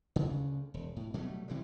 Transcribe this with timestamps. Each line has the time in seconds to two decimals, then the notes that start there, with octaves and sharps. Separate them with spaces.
0.16 D2 C#3
0.74 E1
0.96 A2
1.14 B2 F#3 G3 A3
1.48 C3 E3 F#3 G3